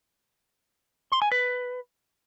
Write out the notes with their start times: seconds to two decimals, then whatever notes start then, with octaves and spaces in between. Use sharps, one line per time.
1.12 C6
1.22 G#5
1.32 B4